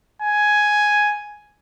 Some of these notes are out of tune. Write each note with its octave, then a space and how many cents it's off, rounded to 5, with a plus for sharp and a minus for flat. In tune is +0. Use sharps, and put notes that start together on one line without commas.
G#5 +5